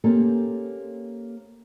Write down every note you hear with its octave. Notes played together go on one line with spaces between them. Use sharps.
A#3 C4 C#4 G4 A4